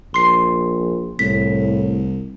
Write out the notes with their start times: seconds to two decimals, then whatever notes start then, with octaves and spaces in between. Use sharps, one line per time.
0.14 A#1 C6 C7
1.19 C2 A2 B6